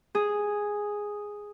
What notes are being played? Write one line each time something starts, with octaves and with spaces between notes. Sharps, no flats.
G#4